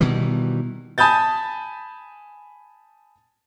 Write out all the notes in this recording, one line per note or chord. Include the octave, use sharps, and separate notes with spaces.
B2 D#3 E3 G3
G#5 A5 B5 D#6 G6 A6